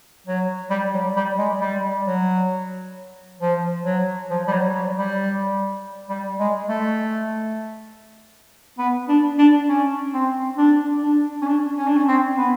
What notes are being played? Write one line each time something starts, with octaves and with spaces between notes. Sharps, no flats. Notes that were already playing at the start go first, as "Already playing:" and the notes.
F#3
G3
F#3
G3
G#3
G3
F#3
F3
F#3
F3
G3
F#3
F#3
G3
G3
G#3
A3
B3
D4
D4
C#4
C4
D4
D4
C#4
D4
C#4
D4
C#4
C4
B3